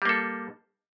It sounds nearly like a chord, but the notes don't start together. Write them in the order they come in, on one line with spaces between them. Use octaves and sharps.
G3 A#3 A4